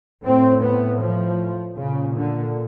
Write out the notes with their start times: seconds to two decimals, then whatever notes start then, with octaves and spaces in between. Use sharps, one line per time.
0.24 A2 C4
0.63 B3
1.02 F3
1.77 A#2 C#3
2.16 D3